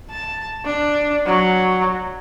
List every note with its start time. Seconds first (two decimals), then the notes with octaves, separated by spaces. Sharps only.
0.10 A5
0.65 D4
1.26 F#3